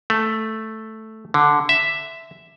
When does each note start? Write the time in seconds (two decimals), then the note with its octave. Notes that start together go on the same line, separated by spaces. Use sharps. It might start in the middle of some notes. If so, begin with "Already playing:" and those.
0.10 A3
1.34 D3
1.69 E5